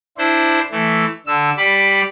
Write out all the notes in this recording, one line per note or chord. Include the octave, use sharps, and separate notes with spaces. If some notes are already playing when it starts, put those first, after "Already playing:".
D4 E4 C5
E3 A3
D3 E6
G3 D5 B5